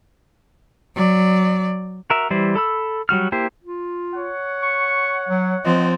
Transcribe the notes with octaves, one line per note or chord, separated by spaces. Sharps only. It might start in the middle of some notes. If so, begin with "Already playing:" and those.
F#3 D5
F#4 A#4 E5
E3 G3 E4 C5
A4 B5 E6
F#3 G3 F#4 F6
A#3 E4 G4 C5
F4
C#5 F#5
C#6
F#3
F3 C4 D#5